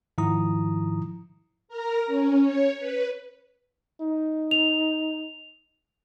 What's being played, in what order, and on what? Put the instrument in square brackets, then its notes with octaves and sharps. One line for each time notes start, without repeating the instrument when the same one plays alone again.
[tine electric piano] G#2 D#3 F3 E4 A#5 D#6
[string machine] A#4 A#5
C#4
C#5
B4
[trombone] D#4
[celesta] F7